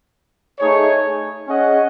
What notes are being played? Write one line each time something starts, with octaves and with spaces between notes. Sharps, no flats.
A3 D#4 G#4 C#5
C#4 G#4 D#5 F#5